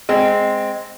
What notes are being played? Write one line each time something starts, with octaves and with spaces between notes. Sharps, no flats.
G#3 C4